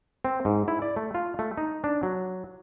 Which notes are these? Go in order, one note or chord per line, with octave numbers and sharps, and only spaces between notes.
C4
G#2
E4
D5
A3
F4
A3
D#4
D4
F#3